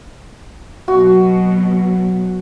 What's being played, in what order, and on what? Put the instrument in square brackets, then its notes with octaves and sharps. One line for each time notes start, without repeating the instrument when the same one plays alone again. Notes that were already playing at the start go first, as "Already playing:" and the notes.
[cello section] B2 F#3 [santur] F#4